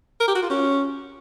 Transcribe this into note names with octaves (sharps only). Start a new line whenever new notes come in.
A#4
G4
F#4
F4
C#4